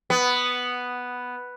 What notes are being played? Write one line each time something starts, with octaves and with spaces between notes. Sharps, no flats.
B3